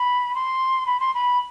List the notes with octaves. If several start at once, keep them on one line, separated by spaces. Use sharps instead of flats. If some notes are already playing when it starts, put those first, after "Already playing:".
Already playing: B5
C6
B5
C6
B5